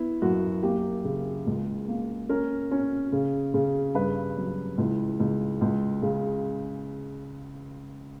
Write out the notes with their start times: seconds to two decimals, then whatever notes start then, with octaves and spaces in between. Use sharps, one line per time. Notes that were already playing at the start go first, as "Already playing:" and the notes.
Already playing: B3 E4
0.22 F#2 F#4
0.63 A#3 G4
1.04 C#3
1.47 C#2
1.88 A#3
2.29 C#4 A#4
2.71 C#4
3.12 C#3
3.54 C#3
3.95 G2 B4
4.37 F#3
4.78 C#2 E4
5.20 C#2
5.61 C#2
6.02 C#3